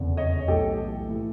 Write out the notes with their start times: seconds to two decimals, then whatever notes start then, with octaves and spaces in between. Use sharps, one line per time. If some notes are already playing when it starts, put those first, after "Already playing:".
Already playing: F1 E2 C#3
0.17 C#5 D#5
0.48 B1 A2 E3 G4 A4
1.07 A2 E3